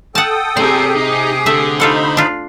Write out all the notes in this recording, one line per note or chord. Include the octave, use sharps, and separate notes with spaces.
A4 F#5 G5 A5 D#6
C3 G4 G#4 C5 D5 A#5
D#4 D#5 D#6
D3 A3 E5
D#4 F4 A4 C5 F#5 B5
D4 F4